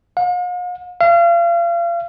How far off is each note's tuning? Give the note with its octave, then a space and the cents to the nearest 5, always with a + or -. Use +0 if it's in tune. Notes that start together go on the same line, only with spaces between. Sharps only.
F5 +45
F5 -35